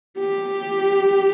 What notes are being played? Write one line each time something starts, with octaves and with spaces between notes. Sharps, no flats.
G4